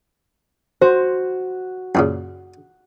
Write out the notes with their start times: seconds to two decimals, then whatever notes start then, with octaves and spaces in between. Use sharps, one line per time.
0.81 F#4 C5
1.95 F#2 A#2 C#3